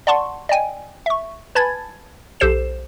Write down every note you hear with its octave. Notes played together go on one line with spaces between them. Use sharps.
D5 F#5 A5 C6 C#6
D5 D#5 G5 G#5
E5 C#6
B4 G#5 A5 B5 G#6 A6
B1 G4 A4 C5 C7 E7